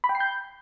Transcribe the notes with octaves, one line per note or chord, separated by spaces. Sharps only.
B5
G5
C7
G6